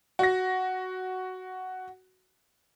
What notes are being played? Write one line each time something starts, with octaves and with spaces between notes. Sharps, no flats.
F#4 A#6